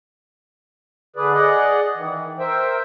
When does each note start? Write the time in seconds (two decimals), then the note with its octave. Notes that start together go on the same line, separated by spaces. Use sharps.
1.16 D3 G#4 B4 D5
1.34 G#4 D5 D#5 F#5
1.96 D#3 E3
2.39 A#4 C5 E5 G5